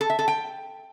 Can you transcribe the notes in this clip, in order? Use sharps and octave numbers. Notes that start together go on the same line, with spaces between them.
A4
E5
A4
G5